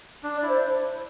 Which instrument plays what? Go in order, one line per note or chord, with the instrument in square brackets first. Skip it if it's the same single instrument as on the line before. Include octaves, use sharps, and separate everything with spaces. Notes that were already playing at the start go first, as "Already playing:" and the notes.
[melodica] D4
[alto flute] D5
[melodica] E4
[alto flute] C5